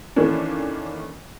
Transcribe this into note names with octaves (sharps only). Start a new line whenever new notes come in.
D#3 E3 A3 A#3 C#4 D4